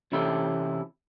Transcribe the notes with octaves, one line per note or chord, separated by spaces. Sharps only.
C3 E3 C#4 E4 G4 A4